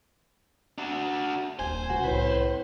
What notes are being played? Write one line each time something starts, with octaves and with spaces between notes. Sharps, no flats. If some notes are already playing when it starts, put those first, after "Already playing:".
D4 F#4
D#1 C5 G#5
C#2 F#4
C2 A2 B4